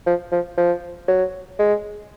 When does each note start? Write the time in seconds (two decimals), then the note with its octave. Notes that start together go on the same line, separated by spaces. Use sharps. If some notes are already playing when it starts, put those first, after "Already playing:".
0.06 F3
0.32 F3
0.57 F3
1.08 F#3
1.59 G#3